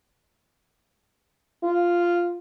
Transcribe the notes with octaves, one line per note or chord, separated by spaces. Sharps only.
F4